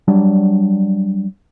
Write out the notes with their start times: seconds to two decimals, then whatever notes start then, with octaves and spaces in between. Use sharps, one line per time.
0.08 F#3 G3 D4